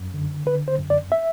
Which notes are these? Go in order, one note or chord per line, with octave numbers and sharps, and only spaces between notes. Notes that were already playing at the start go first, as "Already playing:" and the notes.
Already playing: F#2
D3
D3 B4
C5
F#2
D5
E5